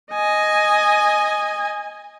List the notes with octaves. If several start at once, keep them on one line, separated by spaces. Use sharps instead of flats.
D#5 G#5